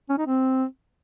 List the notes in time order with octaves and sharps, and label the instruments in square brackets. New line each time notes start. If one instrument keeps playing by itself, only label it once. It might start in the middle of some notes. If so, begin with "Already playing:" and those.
[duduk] C#4
D#4
C4